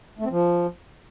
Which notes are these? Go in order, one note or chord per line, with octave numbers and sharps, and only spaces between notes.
A3
C4
F3